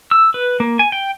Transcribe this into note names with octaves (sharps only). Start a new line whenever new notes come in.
E6
B4
A#3
G#5
G5